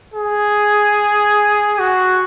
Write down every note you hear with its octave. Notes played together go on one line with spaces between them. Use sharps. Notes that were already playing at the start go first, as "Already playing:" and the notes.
G#4
F#4